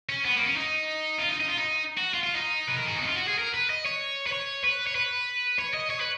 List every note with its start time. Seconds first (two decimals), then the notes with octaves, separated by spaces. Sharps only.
0.09 C#4
0.25 B3
0.36 A#3
0.46 C#4
0.56 D#4
1.19 F4
1.29 D#4
1.40 D#4
1.48 F4
1.57 D#4
1.97 F#4
2.13 F4
2.23 F4
2.34 D#4
2.68 B4
2.77 A#4
2.88 G#4
2.98 F#4
3.07 F4
3.17 F#4
3.28 G#4
3.39 A#4
3.54 B4
3.70 D#5
3.85 C#5
4.27 B4
4.32 C#5
4.64 B4
4.87 C#5
4.95 B4
5.59 C#5
5.74 D#5
5.90 C#5
6.00 B4